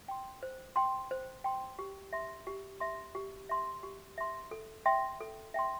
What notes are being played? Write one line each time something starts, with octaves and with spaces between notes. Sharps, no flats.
G5 C6
C5
G5 C6
C5
G5 C6
G4
E5 C6
G4
E5 C6
G4
E5 C6
G4
E5 C6
A4
E5 G5 C6
A4
E5 G5 C6